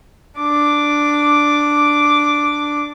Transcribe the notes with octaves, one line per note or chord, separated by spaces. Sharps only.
D4 D6